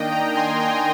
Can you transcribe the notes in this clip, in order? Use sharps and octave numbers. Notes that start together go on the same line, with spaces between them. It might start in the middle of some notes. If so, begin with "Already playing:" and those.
Already playing: D#3 A#3 D4 D#5 G5
G5 A#5
G#5 C6
G5 A#5